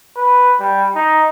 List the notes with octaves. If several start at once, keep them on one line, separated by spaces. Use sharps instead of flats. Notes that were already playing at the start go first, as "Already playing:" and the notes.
B4
G3
D#4